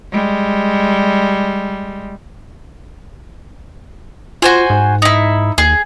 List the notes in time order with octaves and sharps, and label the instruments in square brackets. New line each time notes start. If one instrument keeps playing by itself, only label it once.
[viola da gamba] G3 G#3
[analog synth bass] F4 [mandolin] F#4 C5 G#5
[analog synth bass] G#2
[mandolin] D#4 E4
[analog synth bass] D#2 [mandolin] G#4